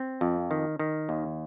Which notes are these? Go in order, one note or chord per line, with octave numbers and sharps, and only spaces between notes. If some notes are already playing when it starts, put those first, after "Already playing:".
Already playing: C4
F2
D#3
D#3
D#2